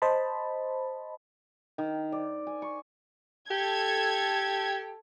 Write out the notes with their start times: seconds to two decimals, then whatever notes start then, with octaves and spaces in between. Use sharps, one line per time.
0.02 C5 D#5 A5 B5
1.78 D#3
2.12 D5
2.47 G#5
2.62 C#6
3.51 G4 A4 G#6